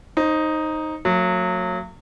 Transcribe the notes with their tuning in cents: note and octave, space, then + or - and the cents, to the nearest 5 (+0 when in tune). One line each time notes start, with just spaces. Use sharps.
D#4 +0 C5 +25
F#3 -20 A#3 -45